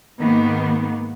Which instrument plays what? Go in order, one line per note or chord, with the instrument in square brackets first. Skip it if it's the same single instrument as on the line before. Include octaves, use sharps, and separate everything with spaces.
[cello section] G#2 D#3 A#3 B3